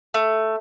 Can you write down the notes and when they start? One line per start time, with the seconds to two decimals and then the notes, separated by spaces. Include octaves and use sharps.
0.14 A3